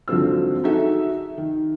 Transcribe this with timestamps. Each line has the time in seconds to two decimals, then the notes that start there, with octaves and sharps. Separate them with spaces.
0.08 G#1 D3 F3 F#3 C4 E6
0.64 D#4 F#4 G#4 A4 E5
1.38 D#3